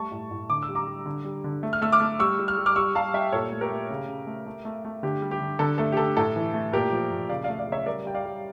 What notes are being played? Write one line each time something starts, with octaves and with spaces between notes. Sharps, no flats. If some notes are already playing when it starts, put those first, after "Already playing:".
Already playing: G3 A3 A5 C#6
A2
A2
D3 D6
E6
G3
A#5 D6
G3
D3
G3
D3
A3
F6
A3 E6
D6 F6
A3
G3 C#6 E6
G3
F6
G3
D6 F6
G3 C#6 E6
G3 F5 A5
G3 E5 G5
A#2 A4 C#5
A3
G4 A#4
A3
C#3
C#3
A3
A3
A3
A3
D3 G4
G3
G4
D3
D3 A4
A3 A4
G4
D3 A4
A2 A4
E3
A3
A#2 G4 A#4
F3
A#2
C#3 D5 F5
A3 D5 F5
D5 F5
C#3
C#5 E5
G3 A#4 D5
G3 G5
D5 F5
G3